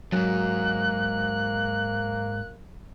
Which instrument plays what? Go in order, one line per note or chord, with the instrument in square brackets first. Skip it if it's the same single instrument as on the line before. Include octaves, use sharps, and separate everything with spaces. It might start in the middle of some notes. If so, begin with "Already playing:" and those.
[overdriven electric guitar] F2 G#2 [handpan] F#3 [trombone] A#3 [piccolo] F#6